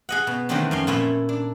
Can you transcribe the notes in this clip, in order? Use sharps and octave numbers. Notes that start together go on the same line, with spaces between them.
G#4 D#5 F#5
B2
D#3 E3 F#3 A3 C4 D4
F2 C#4 C6
A#2 A3 A#3 E4 C#5 E5
D4